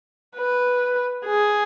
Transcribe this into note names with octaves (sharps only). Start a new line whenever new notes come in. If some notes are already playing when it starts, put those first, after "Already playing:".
B4
G#4